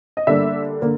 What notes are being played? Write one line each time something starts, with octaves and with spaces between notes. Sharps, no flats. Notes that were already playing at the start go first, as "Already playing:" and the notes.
D#5
D3 G3 A#3 D4 E5
D3 A#3